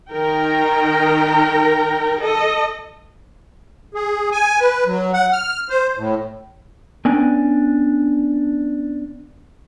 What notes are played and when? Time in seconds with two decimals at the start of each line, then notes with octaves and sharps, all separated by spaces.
0.12 D#3 A#4 G5
2.22 A4 D#5
3.94 G#4
4.32 G#5
4.60 B4
4.86 F#3
5.13 F#5
5.33 F6
5.70 C5
5.97 A2
7.05 B3 C#4 D4 G5 G#5